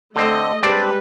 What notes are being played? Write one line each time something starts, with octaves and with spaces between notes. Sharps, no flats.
D3 A3 C4 D#5
G3 G#3 C4 D4 B4 D5